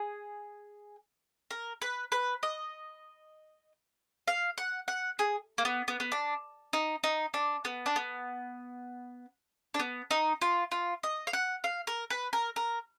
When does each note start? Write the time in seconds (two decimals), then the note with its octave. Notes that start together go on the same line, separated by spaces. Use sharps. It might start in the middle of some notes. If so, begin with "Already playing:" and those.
Already playing: G#4
1.50 A#4
1.82 B4
2.12 B4
2.43 D#5
4.28 F5
4.58 F#5
4.88 F#5
5.19 G#4
5.58 A#3
5.65 B3
5.88 B3
6.00 B3
6.12 D4
6.73 D#4
7.04 D#4
7.34 D4
7.65 B3
7.86 D4
7.96 B3
9.74 D4
9.79 B3
10.11 D#4
10.42 F4
10.71 F4
11.03 D#5
11.27 F5
11.33 F#5
11.64 F5
11.87 A#4
12.10 B4
12.33 A#4
12.56 A#4